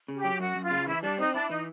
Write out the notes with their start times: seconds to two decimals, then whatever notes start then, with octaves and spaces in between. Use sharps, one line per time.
0.08 C#3
0.16 G4
0.24 F#3
0.40 F#2 F#4
0.56 F#2
0.64 F4
0.71 C#3
0.87 E3 E4
1.02 G3 D4
1.18 C4 D#4
1.34 D4 E4
1.50 E3 D#4